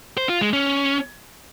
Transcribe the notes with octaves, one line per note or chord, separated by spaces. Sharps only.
C5
F4
G#3
C#4